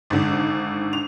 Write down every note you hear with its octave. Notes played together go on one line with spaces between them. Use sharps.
G#1 D3
F7